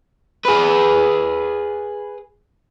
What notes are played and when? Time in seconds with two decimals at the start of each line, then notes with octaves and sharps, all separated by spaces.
0.45 G#4 B4